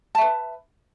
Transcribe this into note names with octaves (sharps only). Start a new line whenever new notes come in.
B4 E5 A5